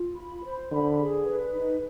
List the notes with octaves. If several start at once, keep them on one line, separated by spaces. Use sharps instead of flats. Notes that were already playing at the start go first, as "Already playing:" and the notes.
Already playing: F4
B5
C5
D3 B5
G#4
B4
D#4